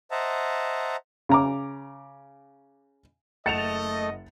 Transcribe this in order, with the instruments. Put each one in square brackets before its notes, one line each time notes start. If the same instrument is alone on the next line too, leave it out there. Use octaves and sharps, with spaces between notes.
[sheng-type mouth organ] C5 D#5 E5 F#5 A5 A#5
[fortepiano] C#3 A#5 D6
[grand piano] F#1 F#5 C#7 [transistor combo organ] A3 [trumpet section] D#5 [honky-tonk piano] A6 E7 F7